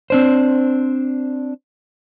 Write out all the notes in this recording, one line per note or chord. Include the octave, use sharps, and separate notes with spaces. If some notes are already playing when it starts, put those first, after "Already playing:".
C4 D4 C5